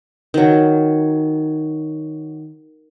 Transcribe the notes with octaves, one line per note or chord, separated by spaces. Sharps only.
D#3 F#3